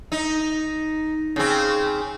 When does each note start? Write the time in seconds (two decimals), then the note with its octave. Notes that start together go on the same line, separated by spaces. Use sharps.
0.12 D#4
1.36 C#3 C4